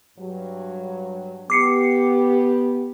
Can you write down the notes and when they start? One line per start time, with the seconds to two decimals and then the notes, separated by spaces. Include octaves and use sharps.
0.19 G2 F#3
1.50 B3 G4 D6 C7 C#7